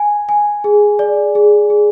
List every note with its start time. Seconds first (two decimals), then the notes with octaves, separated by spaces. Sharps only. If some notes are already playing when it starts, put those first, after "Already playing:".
Already playing: G#5
0.29 G#5
0.64 G#4
0.99 D5
1.35 G#4
1.70 G#4